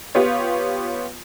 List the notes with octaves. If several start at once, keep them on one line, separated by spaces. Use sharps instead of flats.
B3 F4 G4 C#5